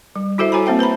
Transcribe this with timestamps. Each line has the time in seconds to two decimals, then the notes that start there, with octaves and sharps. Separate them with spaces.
0.16 G3
0.38 E4 F#4 A4 C5 E5
0.52 F#4 C#5 G#5 A#5 B5
0.66 A#3 C4 C5 E5 G5
0.79 B4 C5 A#5 B5